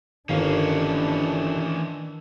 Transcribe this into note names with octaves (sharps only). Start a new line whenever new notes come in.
G1 D#3 E3 C#4 D4 F5 A#5